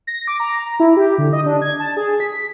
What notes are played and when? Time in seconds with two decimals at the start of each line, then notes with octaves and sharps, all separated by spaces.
0.07 A#6
0.28 D6
0.40 A#5
0.80 E4
0.97 G4
1.18 D3
1.33 D#5
1.46 D4
1.62 G#6
1.80 A5
1.97 G#4
2.20 B6